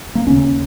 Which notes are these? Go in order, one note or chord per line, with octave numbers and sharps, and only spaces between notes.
A#3
D#2 C#3 C#4